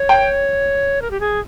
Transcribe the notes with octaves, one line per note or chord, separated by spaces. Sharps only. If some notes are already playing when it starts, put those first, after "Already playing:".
Already playing: C#5
G5
A#4
G4
G#4